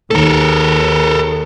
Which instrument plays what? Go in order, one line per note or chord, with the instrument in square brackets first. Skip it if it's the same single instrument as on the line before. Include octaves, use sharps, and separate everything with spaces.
[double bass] D#2 D#3 [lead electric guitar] A4 A#4